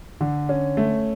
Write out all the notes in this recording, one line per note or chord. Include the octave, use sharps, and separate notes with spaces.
D3
C#4
A3